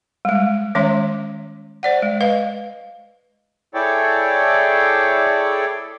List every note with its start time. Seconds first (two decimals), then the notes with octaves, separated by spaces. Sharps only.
0.25 G3 G#3
0.75 D#3 G#3 C#4 C#5 E5 C6
1.83 C5 D5 F#5
2.02 G#3
2.21 B4 D#5 F5
3.74 E4 G#4 A4 C#5 D5 G5